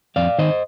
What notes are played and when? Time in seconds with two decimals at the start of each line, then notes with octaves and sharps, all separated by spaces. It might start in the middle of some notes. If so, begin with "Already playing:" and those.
0.16 F2 D5 F5
0.39 D#3 C5 D#5